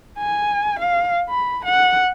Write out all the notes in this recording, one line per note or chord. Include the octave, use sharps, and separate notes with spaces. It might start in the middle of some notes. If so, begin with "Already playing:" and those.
G#5
F5
B5
F#5